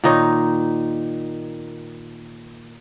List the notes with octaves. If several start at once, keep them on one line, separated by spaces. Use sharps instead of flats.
A#2 D#3 D#4 C#5